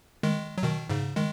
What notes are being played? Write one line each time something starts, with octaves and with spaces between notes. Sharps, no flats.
D#3 G#3
F#3
B2 D#3
G#2 C#3
D#3 G#3